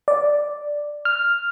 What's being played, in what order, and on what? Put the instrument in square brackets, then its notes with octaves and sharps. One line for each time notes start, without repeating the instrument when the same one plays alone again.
[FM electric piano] D5
F6